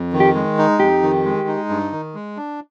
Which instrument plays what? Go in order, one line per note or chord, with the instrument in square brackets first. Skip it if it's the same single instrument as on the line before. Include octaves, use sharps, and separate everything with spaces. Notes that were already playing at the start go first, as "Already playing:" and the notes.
Already playing: [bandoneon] F2
D#3
[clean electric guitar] G4
[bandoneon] G#3
D#4
[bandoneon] F2 [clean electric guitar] G4
[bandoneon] D#3
G#3
D#4
G2
D#3
G#3
D4